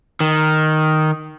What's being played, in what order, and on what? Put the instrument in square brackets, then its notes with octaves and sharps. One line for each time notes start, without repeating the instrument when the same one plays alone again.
[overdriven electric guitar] D#3